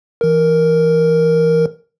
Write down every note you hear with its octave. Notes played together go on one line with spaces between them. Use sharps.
E3 A#4